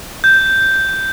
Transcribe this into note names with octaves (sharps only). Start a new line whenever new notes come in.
G6